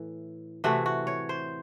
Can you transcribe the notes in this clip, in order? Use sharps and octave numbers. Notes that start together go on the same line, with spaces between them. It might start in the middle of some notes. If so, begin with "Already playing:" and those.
Already playing: A2 E3
C3 E3 A3 F#4
F#4
C#5
C5